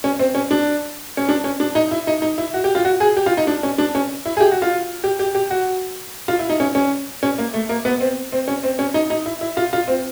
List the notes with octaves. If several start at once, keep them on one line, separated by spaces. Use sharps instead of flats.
C#4
C4
C#4
D4
C#4
D4
C#4
D4
D#4
E4
D#4
D#4
E4
F#4
G4
F4
F#4
G#4
G4
F4
D#4
D4
C#4
D4
C#4
E4
G#4
G4
F#4
F4
G4
G4
G4
F#4
F4
E4
D#4
C#4
C#4
C#4
A#3
A3
A#3
B3
C4
C4
C#4
C4
C#4
D#4
D#4
E4
E4
F4
F4
C4